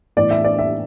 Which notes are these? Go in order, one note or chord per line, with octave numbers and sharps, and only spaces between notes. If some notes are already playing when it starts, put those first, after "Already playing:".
A2 E3 B3 D5
E5
D5
E5